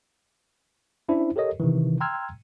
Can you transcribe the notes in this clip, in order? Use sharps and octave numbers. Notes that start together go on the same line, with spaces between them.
C#4 D4 E4 C5
G4 A4 A#4 C#5 D#5
C3 D#3 E3
G5 A#5 C6 E6 F6 G#6